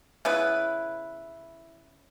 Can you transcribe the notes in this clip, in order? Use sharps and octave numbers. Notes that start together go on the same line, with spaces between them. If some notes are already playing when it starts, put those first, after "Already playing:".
C#3 B3 E4 B4